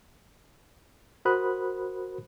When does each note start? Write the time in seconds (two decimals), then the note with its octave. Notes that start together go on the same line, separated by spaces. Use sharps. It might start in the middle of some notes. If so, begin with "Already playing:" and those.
1.25 F#4 A#4 C5 B5 D#6 F#6